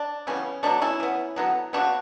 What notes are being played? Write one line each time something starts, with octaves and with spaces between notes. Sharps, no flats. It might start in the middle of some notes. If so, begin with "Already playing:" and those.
Already playing: D4
C#3 E3 G3 B3 C#4
B2 F#3 A3 D4
C#4 E4
E3 B3
D3 F#3 B3
C#3 G3 B3 D4 F#4